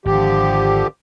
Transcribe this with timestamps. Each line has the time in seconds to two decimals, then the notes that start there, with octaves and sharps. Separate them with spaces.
0.06 G#1 D3 F3 G4